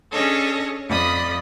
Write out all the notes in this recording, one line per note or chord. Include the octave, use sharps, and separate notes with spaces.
C#4 D4 G#4 A4 C#5 D#5
F2 D5 D#5 B5 D#6